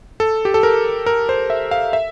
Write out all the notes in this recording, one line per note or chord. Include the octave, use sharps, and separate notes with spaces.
A4
G4
A4
A#4
A#4
C5
E5
F5
E5